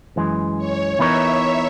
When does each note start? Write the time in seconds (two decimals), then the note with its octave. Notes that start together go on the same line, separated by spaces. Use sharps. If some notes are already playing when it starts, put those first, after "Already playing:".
0.16 F#2 E3 G#3
0.58 C#5
0.99 E3 B3 D#4 A#4 C#5 E5